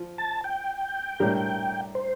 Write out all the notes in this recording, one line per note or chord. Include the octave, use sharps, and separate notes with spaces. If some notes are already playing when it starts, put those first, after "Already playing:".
Already playing: F3
A5
G5
A2 G3 D4 G4 A#4
C5